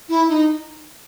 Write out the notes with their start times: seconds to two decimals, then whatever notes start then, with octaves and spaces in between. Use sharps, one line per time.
0.09 E4
0.29 D#4